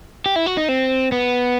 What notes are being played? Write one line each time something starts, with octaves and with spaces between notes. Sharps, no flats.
G4
E4
F#4
D#4
C4
B3